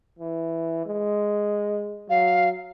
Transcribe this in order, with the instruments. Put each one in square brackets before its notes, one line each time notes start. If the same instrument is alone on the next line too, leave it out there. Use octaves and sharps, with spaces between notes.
[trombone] E3
G#3
[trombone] F#3 [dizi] F5